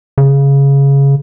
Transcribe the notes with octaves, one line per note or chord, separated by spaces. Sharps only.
C#3